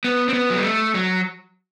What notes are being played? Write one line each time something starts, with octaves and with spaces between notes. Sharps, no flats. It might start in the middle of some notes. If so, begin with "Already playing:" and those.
B3
C4
B3
F#3
G3
A3
F#3